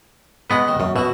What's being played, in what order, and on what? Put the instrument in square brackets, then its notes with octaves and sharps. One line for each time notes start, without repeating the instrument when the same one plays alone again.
[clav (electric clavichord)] G#3 B3 B4 [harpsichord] C#4 D#5 F#5
[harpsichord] D#2 D#3
[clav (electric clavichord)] F#2 [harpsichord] C#4
[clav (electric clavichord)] B2 [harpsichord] E4 F#4 E5